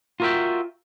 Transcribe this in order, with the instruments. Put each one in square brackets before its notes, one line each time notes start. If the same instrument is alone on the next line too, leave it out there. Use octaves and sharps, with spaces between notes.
[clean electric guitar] F4 F#4 A#4 D#5 E5 G5